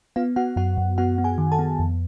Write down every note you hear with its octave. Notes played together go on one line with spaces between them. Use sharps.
B3 F4 F5
B3 F#4 F#5
F#2 F#4 F#5
F#2
B3 F#4 F#5
B3
G#4 G#5
D#3
A4 A5
B3
F2